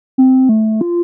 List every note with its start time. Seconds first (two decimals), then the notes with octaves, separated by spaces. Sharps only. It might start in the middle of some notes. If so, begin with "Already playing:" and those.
0.18 C4
0.49 A3
0.81 F4